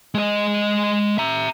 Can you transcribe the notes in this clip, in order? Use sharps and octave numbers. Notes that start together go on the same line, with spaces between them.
G#3 D#5
E5 A#5